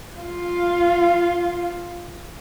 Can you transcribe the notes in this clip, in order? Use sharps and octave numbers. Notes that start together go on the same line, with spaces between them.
F4 F5